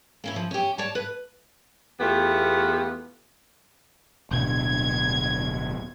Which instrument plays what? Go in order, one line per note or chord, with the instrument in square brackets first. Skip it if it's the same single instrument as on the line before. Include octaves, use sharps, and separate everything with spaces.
[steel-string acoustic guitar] A#3 C#4 E4
F3
C#4 G4
C#5 D5 A5
B4
[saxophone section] E2 A3 B3 F4 G4
[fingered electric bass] D1 B2 D3 [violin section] G#6